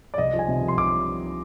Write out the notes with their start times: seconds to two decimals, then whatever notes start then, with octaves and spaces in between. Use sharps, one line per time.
0.14 D5
0.18 C2 D#5
0.34 F3
0.39 G#5
0.49 C3
0.62 C2
0.68 C6
0.78 C2 D6